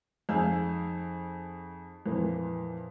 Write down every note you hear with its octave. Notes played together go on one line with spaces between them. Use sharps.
F2 D#4 G#4 F5 E6 G6
F2 A#2 E3